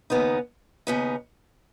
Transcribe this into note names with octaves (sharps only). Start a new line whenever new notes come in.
D#2 C#3 B3 D#4
D#2 C#3 B3 D#4